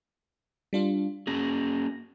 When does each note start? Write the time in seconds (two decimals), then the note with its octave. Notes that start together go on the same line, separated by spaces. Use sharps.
0.73 G3 D4 F4
1.27 A#3 C#4 G#4 A#6